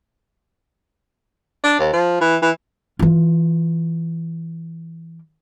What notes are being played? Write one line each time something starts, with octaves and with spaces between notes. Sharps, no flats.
D4
D#2
F3
E3
E3
E3 F4